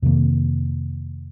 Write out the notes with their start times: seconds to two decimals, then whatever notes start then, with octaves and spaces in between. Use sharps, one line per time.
0.02 F2 C3 D#3 A#3